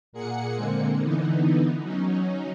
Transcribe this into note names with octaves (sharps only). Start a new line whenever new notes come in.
A#2 A#3 G#4 F#5 C#7
D3 G#3 A#3 C4
D3 E3 B3 D#4
F#3 C#4 D#4